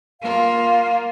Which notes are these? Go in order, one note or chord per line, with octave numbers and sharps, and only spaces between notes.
A#3 F4 F5